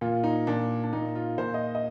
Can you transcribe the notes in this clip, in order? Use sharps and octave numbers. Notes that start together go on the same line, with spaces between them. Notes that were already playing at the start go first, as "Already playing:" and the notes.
A#2 F4
D#4
A#2 D4
D4
A#2 D#4
F4
A#2 C5
D#5
D#5